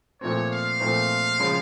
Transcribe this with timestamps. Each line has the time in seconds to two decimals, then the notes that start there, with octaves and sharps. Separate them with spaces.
0.21 A#2 F3 A3 C4 C#5
0.51 F5
0.80 A#2 F3 A3 C4
1.40 C#3 F3 G#3 C#4 F4